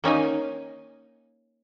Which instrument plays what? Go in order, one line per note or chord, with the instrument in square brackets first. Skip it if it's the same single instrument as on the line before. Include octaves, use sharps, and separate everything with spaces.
[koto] A#3 C#4 D#4 G#5